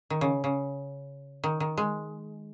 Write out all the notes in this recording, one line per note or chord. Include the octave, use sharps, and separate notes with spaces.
D#3
C#3
C#3
D#3
D#3
G#3